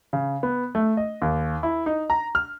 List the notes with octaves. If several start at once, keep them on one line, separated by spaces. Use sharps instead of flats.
C#3
B3
A3
D#5
D#2
E4
D#4
A#5
F6